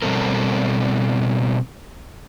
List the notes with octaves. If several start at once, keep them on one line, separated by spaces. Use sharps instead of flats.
B2 G3 C4 A4 A#4